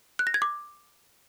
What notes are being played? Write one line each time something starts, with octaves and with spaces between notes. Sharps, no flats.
F#6
A#6
G#6
D6